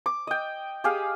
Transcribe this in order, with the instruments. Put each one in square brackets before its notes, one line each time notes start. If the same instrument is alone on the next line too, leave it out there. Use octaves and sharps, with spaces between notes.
[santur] D6
D#5 G5
G4 G#4 F5